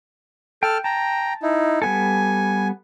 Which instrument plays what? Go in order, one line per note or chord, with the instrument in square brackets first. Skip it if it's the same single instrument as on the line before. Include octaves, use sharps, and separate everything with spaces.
[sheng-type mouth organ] A4 A5 F6 [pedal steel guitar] G5
[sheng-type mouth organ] G5 A#5 [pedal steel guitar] A5
[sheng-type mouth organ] D#4 E4
[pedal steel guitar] G3 B3 A4 [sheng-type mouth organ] G#5